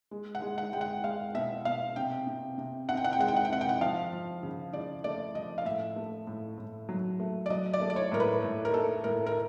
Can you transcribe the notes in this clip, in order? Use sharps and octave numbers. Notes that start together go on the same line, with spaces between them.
G#3
F#5
G#3
F#5
G#3 G5
F#5
G#3 F5
B2 E5
B2 F5
C3 G5
C3
C3
C3 F#5
G5
F#5
G5
G#3 F#5
G5
F#5
G5
C3 F#5
G5
F#5
F3 F5
F3
C#3
C#3 D5
A3 D5
F3 D#5
F5
A2 E5
A3
A2
A2
F#3
A3
D5
F#3 D#5
D5
A3
D5
C#5
A2 A#4
B4
A2
A#4
A3 A4
A2 A#4
A#4